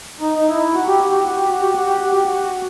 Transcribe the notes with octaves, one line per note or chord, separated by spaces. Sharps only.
D#4
D#4
E4
F#4
G4
F#4
G4
F#4
G4
F#4
G4
F#4
G4
F#4
G4
F#4